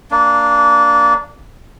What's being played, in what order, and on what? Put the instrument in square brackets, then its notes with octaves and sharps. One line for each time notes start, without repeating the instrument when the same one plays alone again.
[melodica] A#3 D4